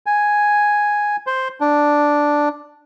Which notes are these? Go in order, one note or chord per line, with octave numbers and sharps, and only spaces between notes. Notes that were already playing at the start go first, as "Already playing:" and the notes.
G#5
C5
D4